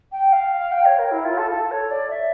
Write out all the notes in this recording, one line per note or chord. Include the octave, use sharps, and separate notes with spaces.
G5
F5
G5
C#5
A#4
E4
F4
A4
A4
C#5
D5
E5